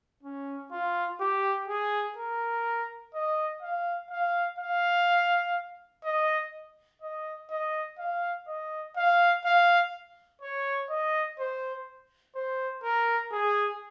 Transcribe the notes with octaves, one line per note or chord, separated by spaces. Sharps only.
C#4
F4
G4
G#4
A#4
D#5
F5
F5
F5
D#5
D#5
D#5
F5
D#5
F5
F5
C#5
D#5
C5
C5
A#4
G#4